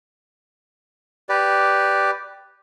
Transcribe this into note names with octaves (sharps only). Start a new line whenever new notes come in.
G4 B4 D5